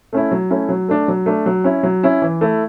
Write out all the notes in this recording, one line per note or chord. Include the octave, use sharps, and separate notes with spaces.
A3 C#4 E4
F#3
A3 C#4 E4
F#3
A3 D4
F#3
A3 D4
F#3
C#4 E4
F#3
C#4 E4
E3
A3 E4